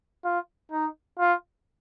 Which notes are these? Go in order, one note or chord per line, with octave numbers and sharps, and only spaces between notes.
F4
D#4
F4